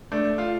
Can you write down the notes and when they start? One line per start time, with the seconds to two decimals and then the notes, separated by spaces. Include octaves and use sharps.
0.12 A3 D4
0.38 F4